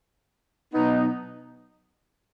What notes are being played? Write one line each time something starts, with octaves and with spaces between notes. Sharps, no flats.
B2 F#3 B3 D#4